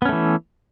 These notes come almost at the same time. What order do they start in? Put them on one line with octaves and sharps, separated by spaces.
B3 C#4 A3 E3